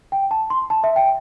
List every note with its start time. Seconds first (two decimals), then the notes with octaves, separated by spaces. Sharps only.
0.12 G5
0.31 A5
0.50 C6
0.70 A5
0.84 E5
0.96 G5